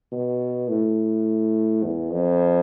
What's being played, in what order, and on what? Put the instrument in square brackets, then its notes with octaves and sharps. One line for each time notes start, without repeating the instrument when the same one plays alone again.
[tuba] B2
A2
E2
F2